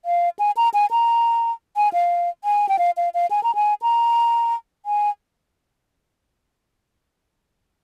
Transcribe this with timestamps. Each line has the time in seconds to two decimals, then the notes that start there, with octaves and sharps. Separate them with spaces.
0.05 F5
0.39 G#5
0.57 A#5
0.74 G#5
0.91 A#5
1.77 G#5
1.93 F5
2.44 G#5
2.69 G5
2.79 F5
2.97 F5
3.14 F5
3.31 G#5
3.43 A#5
3.55 G#5
3.82 A#5
4.86 G#5